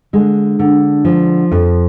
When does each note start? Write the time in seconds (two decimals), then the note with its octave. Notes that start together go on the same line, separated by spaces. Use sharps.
0.13 D3 G#3
0.59 D3
1.05 F3
1.51 F2